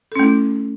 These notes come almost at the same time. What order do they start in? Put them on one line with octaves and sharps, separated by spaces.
A4 C#4 A3 E4